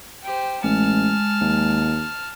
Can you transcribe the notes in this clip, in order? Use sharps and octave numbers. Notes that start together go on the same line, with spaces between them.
G4 C5
A1 G#3 A5 F6
D#2